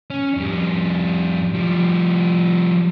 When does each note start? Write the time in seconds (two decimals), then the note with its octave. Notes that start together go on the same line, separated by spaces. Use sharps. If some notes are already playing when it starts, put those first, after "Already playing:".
0.10 C#4
0.37 F2 G3
1.54 F3 G3